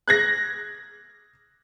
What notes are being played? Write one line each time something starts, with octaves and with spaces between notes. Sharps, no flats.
F#6 G#6 A#6